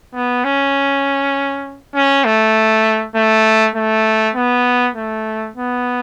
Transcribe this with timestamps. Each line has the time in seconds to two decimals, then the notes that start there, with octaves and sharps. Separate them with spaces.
0.14 B3
0.44 C#4
1.95 C#4
2.25 A3
3.15 A3
3.76 A3
4.35 B3
4.95 A3
5.56 B3